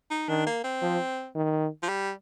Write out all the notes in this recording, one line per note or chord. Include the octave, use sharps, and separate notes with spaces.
D#4
D#3 D4
A#3
C4
F3
D#3
F3
G3